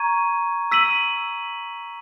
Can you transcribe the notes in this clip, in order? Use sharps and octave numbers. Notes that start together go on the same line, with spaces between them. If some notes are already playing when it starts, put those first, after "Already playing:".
Already playing: A#5 C#6 G#6 D#7
E6 B6 D#7 F#7